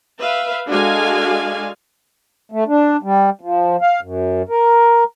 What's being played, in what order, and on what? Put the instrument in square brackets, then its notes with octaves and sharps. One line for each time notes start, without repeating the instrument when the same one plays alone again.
[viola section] B4 E5 F5
G#3 D4 F#4 A4 F5 G#5
[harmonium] A3
D4
G3
F3
F5
F#2
A#4